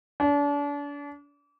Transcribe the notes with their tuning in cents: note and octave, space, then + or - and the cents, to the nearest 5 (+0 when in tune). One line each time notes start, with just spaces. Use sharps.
D4 -35